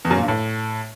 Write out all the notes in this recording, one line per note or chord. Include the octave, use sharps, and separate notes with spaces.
E2
F#2
A#2
G2
A2